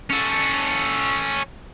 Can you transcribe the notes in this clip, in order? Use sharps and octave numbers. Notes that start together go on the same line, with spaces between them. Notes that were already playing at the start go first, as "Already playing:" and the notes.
C#4 A4